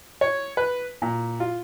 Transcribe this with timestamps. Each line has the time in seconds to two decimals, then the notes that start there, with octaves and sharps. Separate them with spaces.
0.21 C#5
0.57 B4
1.02 A#2
1.40 F4